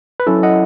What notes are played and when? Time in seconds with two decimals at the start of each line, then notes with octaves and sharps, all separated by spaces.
0.20 B4
0.27 F#3 C#4 E4 A4
0.43 D#5 F#5